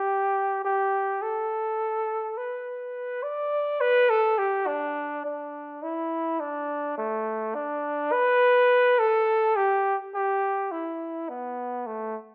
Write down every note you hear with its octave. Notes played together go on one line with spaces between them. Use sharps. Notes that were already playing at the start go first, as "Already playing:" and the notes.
Already playing: G4
G4
A4
B4
D5
B4
A4
G4
D4
D4
E4
D4
A3
D4
B4
A4
G4
G4
E4
B3
A3